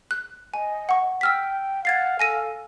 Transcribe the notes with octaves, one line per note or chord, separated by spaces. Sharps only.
F#6
D#5 G#5
F#5 C#6
G5 E6 F6 B6
F5 F#5 G#6 A6 C7
A4 G#5 A#6 D#7